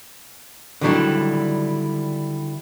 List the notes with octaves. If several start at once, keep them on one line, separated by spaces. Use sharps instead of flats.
D3 D#3 F#3 G3 D4 E4